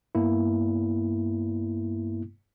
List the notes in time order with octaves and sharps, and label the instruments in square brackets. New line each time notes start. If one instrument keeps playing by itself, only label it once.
[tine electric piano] G2 A#3 B3 E4